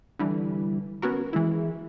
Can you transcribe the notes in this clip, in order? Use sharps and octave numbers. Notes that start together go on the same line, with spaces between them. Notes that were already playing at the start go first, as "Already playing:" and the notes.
D3 E3 G3
B3 C#4 F#4 A#4
E3 G#3 E4